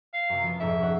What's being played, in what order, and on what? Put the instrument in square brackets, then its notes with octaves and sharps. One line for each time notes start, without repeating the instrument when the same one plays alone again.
[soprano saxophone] F5
[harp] F#2 C3
F3 B3
[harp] B1 F2 G#2 [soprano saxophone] E5
[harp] C#4 F#5